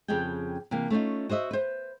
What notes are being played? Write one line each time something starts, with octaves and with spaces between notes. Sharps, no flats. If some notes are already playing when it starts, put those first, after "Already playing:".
F2 C#3 G4 G#4 G5
C3 E3 A#3
A3 C#4 D#4 F4
F#4 C5 D#5 E5
B4 C5